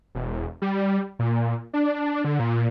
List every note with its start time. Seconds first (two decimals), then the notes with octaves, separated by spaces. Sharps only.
0.15 E1
0.62 G3
1.19 A#2
1.74 D4
2.25 D3
2.39 A#2